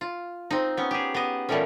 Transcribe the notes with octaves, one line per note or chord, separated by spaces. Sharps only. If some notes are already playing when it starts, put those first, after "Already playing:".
F4
C4 D#4
B3 C#4
G4 G#4
B3 D#5
A#2 E3 G3 A3 C#4